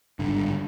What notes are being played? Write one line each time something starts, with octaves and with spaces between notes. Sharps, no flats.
G#1 G2 D3